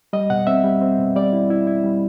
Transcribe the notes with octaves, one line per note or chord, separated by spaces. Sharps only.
G3 D#5
B2 F#5
C4 E5
G3
C4
B2
G3 D5
E4
E4
E4
G3